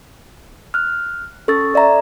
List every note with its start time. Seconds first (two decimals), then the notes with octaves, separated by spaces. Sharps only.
0.74 F6 F#6
1.48 C#4 A4 C#6 E6 A6
1.74 A4 D5 E5 A#5